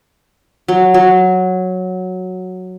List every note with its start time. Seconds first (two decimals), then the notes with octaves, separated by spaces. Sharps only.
0.68 F#3
0.94 F#3